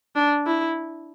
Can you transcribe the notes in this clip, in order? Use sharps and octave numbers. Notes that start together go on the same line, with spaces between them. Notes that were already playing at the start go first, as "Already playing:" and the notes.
D4
E4